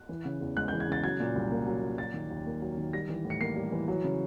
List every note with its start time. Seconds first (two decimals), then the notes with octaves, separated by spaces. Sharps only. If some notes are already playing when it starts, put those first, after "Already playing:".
Already playing: F#6
0.09 E3
0.25 C#3
0.41 E2
0.57 G#3 F#6
0.68 E3 G6
0.80 G#6
0.88 C#3 A6
1.03 F#3 G#6
1.20 A#2
1.35 C2
1.51 A#3
1.67 F#3
1.83 A#2
1.98 F#3 A6
2.14 D#3
2.30 D#2
2.46 A#3
2.62 F#3
2.77 D#3
2.93 G3 A#6
3.09 E3
3.25 A2
3.30 C#7
3.41 A#3 C7
3.56 G3
3.72 E3
3.88 F#3
4.04 C#3